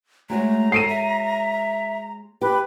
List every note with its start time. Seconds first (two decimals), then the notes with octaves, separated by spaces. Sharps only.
0.30 G#3 A3 F#4 C#5 A#5
0.72 A4 C7 D7 D#7
0.88 E5
2.42 G4 B4